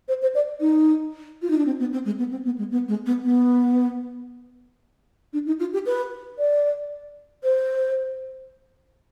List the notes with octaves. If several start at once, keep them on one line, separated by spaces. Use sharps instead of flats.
C5
C5
D5
D#4
F4
D#4
D4
C4
B3
C4
G#3
B3
C4
B3
G#3
B3
G#3
B3
B3
D4
D#4
F4
G4
B4
D5
C5